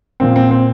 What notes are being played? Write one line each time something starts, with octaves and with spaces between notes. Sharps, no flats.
A#2 F3 C4
C4
C4